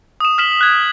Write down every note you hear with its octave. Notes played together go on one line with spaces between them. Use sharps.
D#6 E7
F6 B6 E7 F#7
F#6 G#6